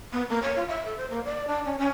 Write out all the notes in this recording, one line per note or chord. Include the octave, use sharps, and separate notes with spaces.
B3
A#3
C#5
F4
E5
A4
C5
A#3
D5
D4
C#4
C#4